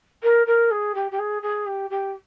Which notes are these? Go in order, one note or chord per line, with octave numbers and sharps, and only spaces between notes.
A#4
A#4
G#4
G4
G4
G#4
G#4
G4
G4